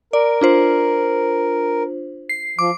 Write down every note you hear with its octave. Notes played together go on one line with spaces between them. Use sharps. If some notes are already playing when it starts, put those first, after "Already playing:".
A#4 D5
D4 F4 C5
C7
F3 D6